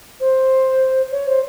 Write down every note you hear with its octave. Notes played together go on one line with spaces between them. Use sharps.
C5
C#5
C5